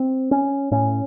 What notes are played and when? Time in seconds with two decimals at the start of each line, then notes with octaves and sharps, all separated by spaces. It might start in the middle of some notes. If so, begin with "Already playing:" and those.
Already playing: C4
0.31 C#4
0.71 A2 C#4